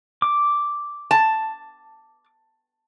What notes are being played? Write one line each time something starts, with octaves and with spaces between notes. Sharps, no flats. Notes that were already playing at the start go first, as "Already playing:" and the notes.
D6
A5